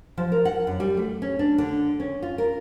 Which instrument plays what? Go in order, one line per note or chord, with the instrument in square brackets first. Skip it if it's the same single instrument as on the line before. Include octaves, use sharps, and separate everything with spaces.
[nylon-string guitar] F3
A#4
F#5
F#2
G3
A3
C#4
D4
D3
C#4
F4
A#4